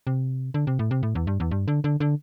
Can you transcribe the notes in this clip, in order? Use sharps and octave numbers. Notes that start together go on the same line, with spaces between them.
C3
D3
C3
A2
C3
A2
E2
G2
E2
G2
D3
D3
D3